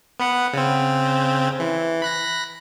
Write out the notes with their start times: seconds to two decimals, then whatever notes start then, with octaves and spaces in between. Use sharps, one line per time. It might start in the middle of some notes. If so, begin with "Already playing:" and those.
0.20 B3 B4 F#5
0.53 C#3 C4
1.60 E3
2.02 B5 F#6 A#6